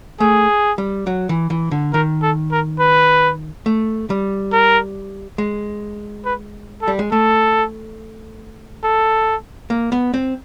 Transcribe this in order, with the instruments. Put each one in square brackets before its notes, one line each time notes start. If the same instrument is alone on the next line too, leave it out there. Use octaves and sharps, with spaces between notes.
[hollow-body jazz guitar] A3 [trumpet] G#4
[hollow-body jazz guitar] G3
F#3
E3
E3
D3
[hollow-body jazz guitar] D#3 [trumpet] A#4
[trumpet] A4
A#4
B4
[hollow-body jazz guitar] A3
G3
[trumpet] A#4
[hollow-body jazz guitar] G#3
[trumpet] B4
A4
[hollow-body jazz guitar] G3
G#3
[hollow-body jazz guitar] A3 [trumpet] A4
[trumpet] A4
[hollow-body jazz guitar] A#3
B3
C4